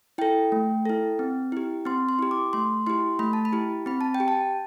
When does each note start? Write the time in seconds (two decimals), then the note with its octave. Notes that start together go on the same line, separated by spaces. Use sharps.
0.18 E4 A4 G5
0.52 A3
0.85 E4 A4
1.19 C4
1.52 E4 G4
1.85 C4 C6
2.09 C6
2.19 E4 G4
2.31 D6
2.53 A3 C6
2.87 E4 G4 C6
3.19 A3 B5
3.33 A5
3.45 B5
3.53 E4 G4
3.86 C4 B5
4.01 A5
4.15 G5
4.20 G4
4.28 A5